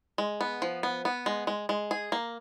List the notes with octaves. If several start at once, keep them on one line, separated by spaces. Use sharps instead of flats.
G#3
B3
F3
B3
B3
G#3
G#3
G#3
G#4
A#3